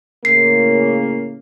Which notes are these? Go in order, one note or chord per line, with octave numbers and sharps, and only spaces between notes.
A2 C#3 A#3 C7